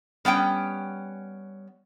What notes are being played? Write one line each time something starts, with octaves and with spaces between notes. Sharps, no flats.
G3 B3 C#4 G5